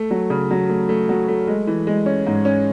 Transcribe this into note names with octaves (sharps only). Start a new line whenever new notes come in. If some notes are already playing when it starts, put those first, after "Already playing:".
Already playing: A3
F#3
C#3
F#3
A3
A3
F#3
A3
G#3
E3
G#3
C#4
G#2
C#4